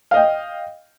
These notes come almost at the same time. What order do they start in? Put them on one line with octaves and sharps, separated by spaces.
F5 D#5 G5